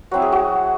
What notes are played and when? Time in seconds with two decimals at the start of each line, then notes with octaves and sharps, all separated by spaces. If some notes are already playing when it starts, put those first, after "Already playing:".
0.11 F#3 C4 E4 F#4
0.22 G#4
0.32 F#4